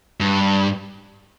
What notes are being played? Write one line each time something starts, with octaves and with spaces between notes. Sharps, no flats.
G2